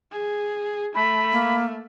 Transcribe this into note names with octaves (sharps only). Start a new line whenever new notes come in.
G#4
A3 B5
A#3